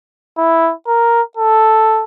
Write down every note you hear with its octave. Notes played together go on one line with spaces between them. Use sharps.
E4
A#4
A4